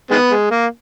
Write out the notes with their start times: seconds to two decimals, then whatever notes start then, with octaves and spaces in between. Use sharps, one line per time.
0.11 D#3 G#3 B3
0.31 G#3
0.51 A#3